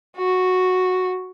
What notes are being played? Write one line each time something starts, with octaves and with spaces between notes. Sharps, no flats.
F#4